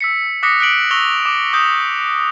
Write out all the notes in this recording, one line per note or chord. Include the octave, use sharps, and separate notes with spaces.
E6 B6 C#7
D6 D#6 F#6 A#6 B6 C#7
F#6 B6 D7 F#7
C#6 E6 A#6 F7 G7
D6
D#6 G6